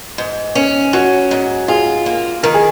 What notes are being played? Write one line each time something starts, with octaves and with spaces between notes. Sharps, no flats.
G#2
C#4
F#3 F#4
G#2
F4 G#4
A#3
D#3 A#4
G#4